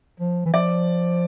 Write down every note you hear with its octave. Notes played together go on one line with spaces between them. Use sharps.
F3
E3
F3 D5